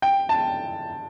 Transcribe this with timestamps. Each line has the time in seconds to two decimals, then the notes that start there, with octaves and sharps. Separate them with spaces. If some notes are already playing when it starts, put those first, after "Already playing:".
0.02 G5
0.29 A5